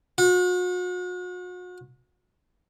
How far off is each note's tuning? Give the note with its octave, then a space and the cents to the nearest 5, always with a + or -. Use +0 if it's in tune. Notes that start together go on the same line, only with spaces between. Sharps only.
F#4 -40